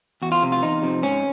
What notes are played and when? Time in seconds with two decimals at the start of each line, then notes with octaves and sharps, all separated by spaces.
0.22 E2 F#4
0.32 F4
0.43 C3 F3
0.52 F4
0.62 E2 D#4
0.82 C3 F3
1.02 G#2 C#4